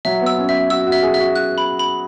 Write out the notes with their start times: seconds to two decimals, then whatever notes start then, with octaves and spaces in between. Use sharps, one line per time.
0.05 F#3 E5
0.21 B3
0.26 E6
0.38 C#4
0.49 E5
0.70 F#4 E6
0.87 F#4
0.92 E5
1.03 G#4
1.14 E5
1.19 F#4
1.36 F#6
1.58 B5
1.79 B5